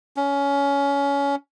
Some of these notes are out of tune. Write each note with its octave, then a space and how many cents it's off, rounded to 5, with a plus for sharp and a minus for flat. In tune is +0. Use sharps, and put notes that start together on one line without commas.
C#4 +20